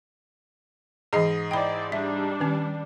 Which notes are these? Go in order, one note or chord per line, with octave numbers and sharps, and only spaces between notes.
G#2 E3 G#4 D#5 C7
E4 C5 D5 G5 B5
G3 D4 E5
D#3 C#4